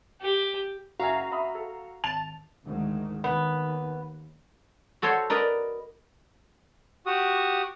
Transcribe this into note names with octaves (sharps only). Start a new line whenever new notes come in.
G4
F#1 F#4 E5 F5 G#5 A#5
E5 B5 D#6
A4
G#1 A5 F7
D2 G#2 D#3
D#2 B3
F#4 A4 C5 C#5
A#4 B4 D5 D#5 A#5
F#4 G4 F#5 D#6